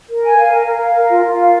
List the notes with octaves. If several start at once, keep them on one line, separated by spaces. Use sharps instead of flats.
A#4
G#5
F5
A#4
A#4
F5
A#4
F4
F4
F5